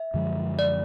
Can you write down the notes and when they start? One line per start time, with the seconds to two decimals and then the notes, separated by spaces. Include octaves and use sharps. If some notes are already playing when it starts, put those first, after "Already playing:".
Already playing: E5
0.14 F#2 D3 F3 G#3
0.59 D5